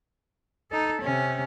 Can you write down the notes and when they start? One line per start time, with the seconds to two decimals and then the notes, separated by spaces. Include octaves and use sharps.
0.71 D#4 A4
1.01 C3 C#4